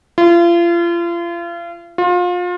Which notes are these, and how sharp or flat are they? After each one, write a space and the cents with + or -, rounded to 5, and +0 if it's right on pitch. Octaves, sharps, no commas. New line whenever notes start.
F4 -35
F4 +30